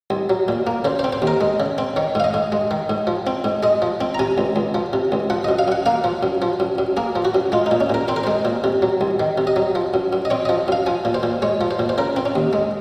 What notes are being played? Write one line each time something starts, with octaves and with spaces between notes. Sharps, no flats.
C2
F#3
A#2
A#3
C#3 C5
C5
C4
C5
D#2
A#4
G#3
C#3
C4
D#3 C#5
G#2 F5
D#5
G#2
G#3
D#3
G#2
F3
C4
G#2
G#3 D#5
F3
C4
A#5
C3 G#5
C#2
C#2
F3
C3
C#2
F3 F#5
F#2 D#5
F5
F#2 F#5
A#3 F5
F3
F#2
F3
F#2
F#2
A#3 G#4
F3
F#4
F#2
G#3 F4
D#4
A#2
C#4
A#2 A#4
C4 C5
A#4
G#3 C5
A#2
C3
F#3
C2
D#3
C3
D#5
F#3
F3
F#2
F#2
D#5
C4 C#5
F3 D#5
F#2 F5
F3 G#5
A#2
C5
A#2
G#3 C#5
F3
C5
A#2
C5
C#3 A#4
C4
C#4
D#2
G#3